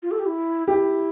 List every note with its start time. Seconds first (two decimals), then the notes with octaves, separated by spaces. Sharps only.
0.03 F4
0.11 A4
0.19 G4
0.27 E4
0.67 E4 G4